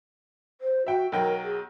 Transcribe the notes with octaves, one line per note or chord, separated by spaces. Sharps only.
C5
F#4 E5 G5
B1 F#3 A#4 G5
G#4